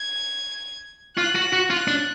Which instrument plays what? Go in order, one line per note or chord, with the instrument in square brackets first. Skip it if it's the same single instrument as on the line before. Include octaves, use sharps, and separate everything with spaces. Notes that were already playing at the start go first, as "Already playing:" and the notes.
Already playing: [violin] G#6
[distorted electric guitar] F4 [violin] F#6
[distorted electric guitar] F#4
F#4
[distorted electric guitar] F4 [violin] F#6
[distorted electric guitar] D4